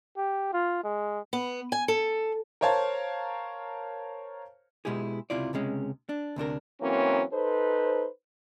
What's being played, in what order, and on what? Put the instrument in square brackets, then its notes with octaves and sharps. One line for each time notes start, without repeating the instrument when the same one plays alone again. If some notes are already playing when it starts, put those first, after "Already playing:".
[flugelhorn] G4
F4
G#3
[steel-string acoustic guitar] B3
G#5
A4
[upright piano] A#4 C5 C#5 F5 A5
[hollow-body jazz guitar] B2 G#3 E4 G4 G#4
C#2 C3 E4 F4 D5
C#2 C3 G#3 C#4
D4
D2 C3 D4 A#4
[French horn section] E3 F#3 A#3 C4 C#4
D#4 A4 B4 C5